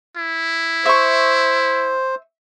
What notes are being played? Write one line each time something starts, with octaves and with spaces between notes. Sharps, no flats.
E4
C5 E5 C#6